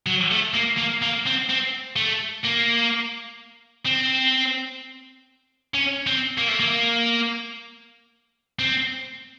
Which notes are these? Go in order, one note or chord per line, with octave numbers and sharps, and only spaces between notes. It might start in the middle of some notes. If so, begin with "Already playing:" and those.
F#3
A3
A#3
A#3
A#3
C4
C4
A3
A#3
C4
C#4
C4
A#3
A3
A#3
C4